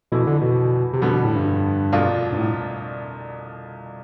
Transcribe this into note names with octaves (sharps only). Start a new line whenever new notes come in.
F2 B2 E3 A3 E4
D3
B2
C3
F2 B2 D3 G3 B3
B2
A2
G2
C2 B2 A3 D4 F4
G2
A2